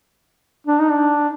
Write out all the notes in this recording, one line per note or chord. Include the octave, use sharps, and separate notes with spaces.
D4
D#4
D4